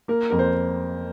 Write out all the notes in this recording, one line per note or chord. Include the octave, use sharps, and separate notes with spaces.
A#3 A#4
F2 A#4
C5